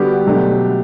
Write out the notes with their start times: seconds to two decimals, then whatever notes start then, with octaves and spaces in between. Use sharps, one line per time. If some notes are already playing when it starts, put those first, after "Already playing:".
Already playing: D3 G3 B3 F#4 G4
0.26 B2 F#3 A3 D4